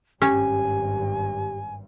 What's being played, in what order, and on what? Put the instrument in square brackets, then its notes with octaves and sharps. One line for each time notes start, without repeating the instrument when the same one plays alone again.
[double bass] G#1 G2 [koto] C#4 [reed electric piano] G4 [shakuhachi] G#5